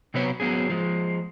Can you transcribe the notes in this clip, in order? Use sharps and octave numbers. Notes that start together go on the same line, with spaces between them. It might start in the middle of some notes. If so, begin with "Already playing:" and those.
C3 F#3 B3 B4 C#5
F#3 B3 C#4 G#4
F3 G#3